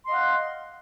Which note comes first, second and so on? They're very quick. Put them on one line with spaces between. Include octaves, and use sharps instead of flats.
C6 D#5 F5 F#5